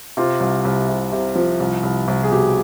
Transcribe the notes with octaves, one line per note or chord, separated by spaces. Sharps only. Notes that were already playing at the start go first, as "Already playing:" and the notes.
C3 F4
C2
C2
C3
C3
F3
C2
C2
C2
G#4
B2 G4